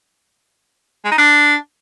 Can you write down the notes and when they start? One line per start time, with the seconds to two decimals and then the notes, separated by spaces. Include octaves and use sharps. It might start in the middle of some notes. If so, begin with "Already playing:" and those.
1.05 G#3
1.11 D#4
1.18 D4